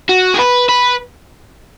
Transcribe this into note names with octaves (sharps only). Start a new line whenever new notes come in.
F#4
G#4
B4
B4